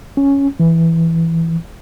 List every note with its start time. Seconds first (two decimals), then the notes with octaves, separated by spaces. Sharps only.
0.17 C#4
0.60 E3